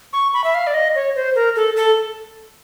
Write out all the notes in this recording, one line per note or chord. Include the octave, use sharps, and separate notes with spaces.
C#6
B5
E5
F5
D5
D#5
C#5
C5
A#4
A4
A4